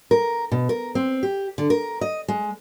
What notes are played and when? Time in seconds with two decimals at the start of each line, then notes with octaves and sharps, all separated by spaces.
0.11 A#4
0.52 B2
0.69 A#4
0.95 C4
1.23 G4
1.58 D3
1.70 A#4
2.01 D#5
2.28 G#3